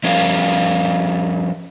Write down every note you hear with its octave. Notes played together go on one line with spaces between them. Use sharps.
F3 G3 C#4 A#4 F5